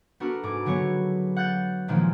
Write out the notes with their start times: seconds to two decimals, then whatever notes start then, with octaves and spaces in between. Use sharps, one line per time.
0.20 B3 D4 F#4 A4 A#4
0.43 G#2 A3 G#4 D6
0.65 D3 F#3 B3 C#5
1.36 F#5 F#6 G6 A6
1.88 A#2 D#3 F3 G#3 A#3